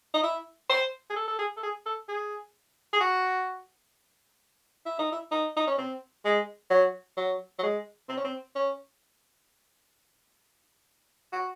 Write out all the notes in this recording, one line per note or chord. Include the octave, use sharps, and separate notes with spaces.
D#4
E4
C5
G#4
A4
A4
G#4
A4
G#4
A4
G#4
G#4
F#4
E4
D#4
E4
D#4
D#4
C#4
C4
G#3
F#3
F#3
F#3
G#3
C4
C#4
C4
C#4
F#4